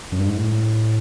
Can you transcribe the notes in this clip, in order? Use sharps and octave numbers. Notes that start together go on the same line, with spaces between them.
F#2
G2
G#2
A2